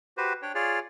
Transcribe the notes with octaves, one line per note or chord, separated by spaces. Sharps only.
F#4 G4 B4 C5
D4 C#5 G5
F4 G#4 C#5 D5